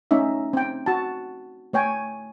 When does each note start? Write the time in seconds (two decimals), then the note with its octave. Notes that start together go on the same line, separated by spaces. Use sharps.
0.11 A3 C#4 D#4 E5
0.53 C4 G5
0.86 F#4 A5
1.73 A3 C#5 G5 G#5